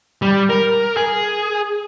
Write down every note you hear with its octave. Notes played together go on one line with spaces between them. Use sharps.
G3
A#4
G#4